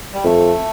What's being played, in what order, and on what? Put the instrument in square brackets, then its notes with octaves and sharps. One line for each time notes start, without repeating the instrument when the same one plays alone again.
[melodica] G3
[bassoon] F2 [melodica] A3